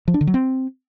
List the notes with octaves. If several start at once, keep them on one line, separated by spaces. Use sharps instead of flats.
F3
D4
D3
F#3
C4